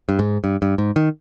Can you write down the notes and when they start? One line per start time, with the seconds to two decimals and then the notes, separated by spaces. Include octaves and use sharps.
0.09 G2
0.19 G#2
0.44 G2
0.62 G2
0.78 G#2
0.96 D#3